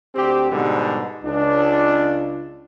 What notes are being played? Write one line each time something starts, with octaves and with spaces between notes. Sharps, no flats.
D2 C4 G4
G#2 B2 D3 G3
C#2 D4